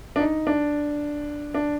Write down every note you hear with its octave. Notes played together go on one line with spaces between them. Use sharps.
D4
D#4
D4
D4